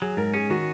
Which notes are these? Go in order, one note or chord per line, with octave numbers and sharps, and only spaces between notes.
F#3 G#4
G#2 A#4
C#4 G#4
D#3 F#4